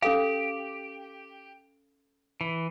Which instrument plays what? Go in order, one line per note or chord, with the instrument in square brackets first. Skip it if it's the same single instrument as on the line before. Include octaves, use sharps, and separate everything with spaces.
[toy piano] C#4 A4 F5 [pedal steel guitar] G4
[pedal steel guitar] E3